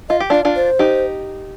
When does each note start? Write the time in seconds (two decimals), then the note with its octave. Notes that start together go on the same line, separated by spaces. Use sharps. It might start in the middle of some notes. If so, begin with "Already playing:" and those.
0.09 F4 D#5
0.20 G4
0.30 D4 F4 D5
0.45 D4 F4
0.56 C5
0.79 D#4 G4